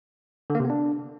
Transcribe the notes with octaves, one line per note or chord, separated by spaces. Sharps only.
D3
A#3
C3
B3
D4